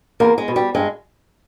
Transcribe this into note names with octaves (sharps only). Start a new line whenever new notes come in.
E2 A#3
G#3
B2
G3
G2 G#3